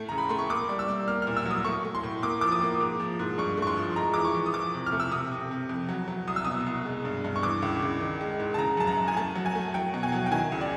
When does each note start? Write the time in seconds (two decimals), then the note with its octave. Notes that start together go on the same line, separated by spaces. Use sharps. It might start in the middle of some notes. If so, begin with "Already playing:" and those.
Already playing: A2 A3
0.09 C#3 A#5
0.18 B5
0.29 A3 C6
0.39 C#6
0.50 A#3 D6
0.69 G3
0.79 E6
0.88 G3
1.08 A#3 F6
1.22 F6
1.27 A#2
1.36 E6
1.45 F#3
1.51 D#6
1.65 A3 C#6
1.85 A3
1.95 C6
2.03 A2
2.22 A#3 D6
2.41 F3 D6
2.52 D#6
2.62 A#3
2.80 G#2
3.00 F3
3.19 G#2
3.38 G2 C#6
3.57 A3
3.62 C#6
3.67 C6
3.77 F3
3.96 G#3 A#5
4.14 E3 D6
4.25 C#6
4.35 E3
4.46 D#6
4.54 F3 D6
4.74 C3
4.86 F6
4.92 A3
5.00 E6
5.12 C3 D#6
5.31 C3
5.51 C3
5.69 F2
5.89 F#3
6.08 F#3
6.27 C2 D#6
6.36 E6
6.45 B2 D#6
6.66 C2
6.85 G#3
7.05 G2
7.24 G2
7.36 C#6
7.42 E3 D6
7.62 C#2
7.82 C#2
8.01 D#3
8.21 G#3
8.40 G#2
8.54 A5
8.58 C#3 A#5
8.77 F#2 A5
8.87 A#5
8.97 F#2
9.08 G#5
9.17 A3 A5
9.35 F#3
9.46 G#5
9.55 A3
9.74 F#3 G5
9.94 B2
10.03 G#5
10.12 F#3
10.26 G5
10.32 D#3 G#5
10.52 C#2
10.61 D5